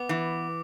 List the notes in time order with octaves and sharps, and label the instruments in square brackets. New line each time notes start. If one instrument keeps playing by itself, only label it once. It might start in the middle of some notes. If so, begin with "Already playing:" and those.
Already playing: [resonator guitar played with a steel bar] B3 [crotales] D6
[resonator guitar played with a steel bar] E3